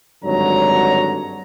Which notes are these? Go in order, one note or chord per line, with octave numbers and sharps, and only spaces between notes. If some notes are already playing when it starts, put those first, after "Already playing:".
G#1 G2 D3 F#3 C#5 A#5